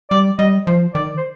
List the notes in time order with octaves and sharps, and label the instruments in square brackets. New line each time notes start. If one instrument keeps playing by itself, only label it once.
[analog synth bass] G3 [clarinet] D5
[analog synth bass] G3 [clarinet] D#5
[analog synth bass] F3 [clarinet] C5
[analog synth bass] D#3 [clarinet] D5
[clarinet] C5